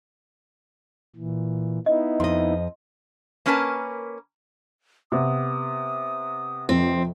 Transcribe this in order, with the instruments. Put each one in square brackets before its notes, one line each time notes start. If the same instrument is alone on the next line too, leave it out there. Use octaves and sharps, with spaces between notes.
[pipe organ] A#2 E3
[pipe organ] B3 D#4 E4 [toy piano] D#5
[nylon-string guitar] F2 D#5 [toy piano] C6
[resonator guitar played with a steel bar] A#3 C#4 A#4 B4 G#5 A5
[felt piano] C3 B3 [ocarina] D#6
[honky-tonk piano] F2 [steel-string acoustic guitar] C4